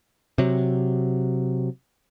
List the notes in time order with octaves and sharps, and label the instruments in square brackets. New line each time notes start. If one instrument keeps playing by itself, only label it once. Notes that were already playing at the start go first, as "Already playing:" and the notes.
[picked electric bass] C3 F#3